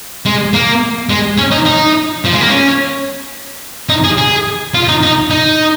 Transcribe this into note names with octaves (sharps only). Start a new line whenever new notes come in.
G#3
A#3
G#3
C#4
D#4
D#4
F3
G#3
A#3
C#4
D#4
G#4
G#4
F4
D#4
D#4
D#4